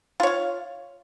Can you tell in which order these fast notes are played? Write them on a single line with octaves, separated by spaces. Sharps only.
F4 C#5 F5